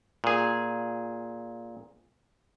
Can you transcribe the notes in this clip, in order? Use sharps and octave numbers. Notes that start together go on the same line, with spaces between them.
A#2 G#4